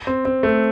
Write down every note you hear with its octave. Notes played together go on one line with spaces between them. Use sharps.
C4
C4
A3